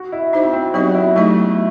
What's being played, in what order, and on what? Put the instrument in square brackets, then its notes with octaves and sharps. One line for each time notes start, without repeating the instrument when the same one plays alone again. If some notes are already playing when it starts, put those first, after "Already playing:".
Already playing: [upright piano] F#4
E4
[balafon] D#4 F#4 C5 D#5
[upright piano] C4
C4
[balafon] F#3 B3 D#4 G4 D#5 [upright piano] F#4
[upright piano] E4
[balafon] F#3 B3 D#4 G4 D#5 [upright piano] A3